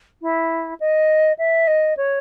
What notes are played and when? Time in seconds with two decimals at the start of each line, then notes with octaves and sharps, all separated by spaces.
0.21 E4
0.80 D#5
1.38 E5
1.67 D#5
1.97 C#5